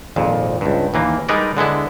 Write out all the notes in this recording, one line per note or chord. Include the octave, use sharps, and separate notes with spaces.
G#1 F2 A#2
C#2 G2
D#2 E3 A#3
G3 G#3 D#4 A#4 B4 D5
D3 G#3 B3 E4